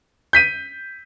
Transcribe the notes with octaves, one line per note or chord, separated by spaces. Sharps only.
G6 B6 D#7